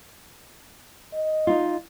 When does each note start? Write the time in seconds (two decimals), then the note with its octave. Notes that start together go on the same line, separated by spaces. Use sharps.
1.14 D#5
1.47 D#4 F4